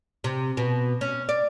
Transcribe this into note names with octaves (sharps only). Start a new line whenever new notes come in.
C3
B2
C#4
D5